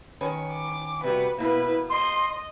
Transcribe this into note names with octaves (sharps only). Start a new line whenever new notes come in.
D#3 C#4 B4
D6
C3 G3 F#4 B4
B2 A#3 E4 B4
D#5 C6